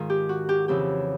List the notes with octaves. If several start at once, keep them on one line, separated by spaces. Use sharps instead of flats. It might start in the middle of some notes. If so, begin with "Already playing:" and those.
Already playing: G#2 D#3 F4
G4
F#4
G4
F2 C#3 E3 G4